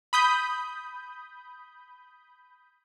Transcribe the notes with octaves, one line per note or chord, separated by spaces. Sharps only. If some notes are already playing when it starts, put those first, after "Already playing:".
B5 D#6 G6